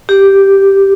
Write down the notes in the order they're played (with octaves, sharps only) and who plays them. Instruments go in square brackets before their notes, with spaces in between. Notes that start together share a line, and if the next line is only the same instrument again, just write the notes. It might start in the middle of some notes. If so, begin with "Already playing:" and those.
[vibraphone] G4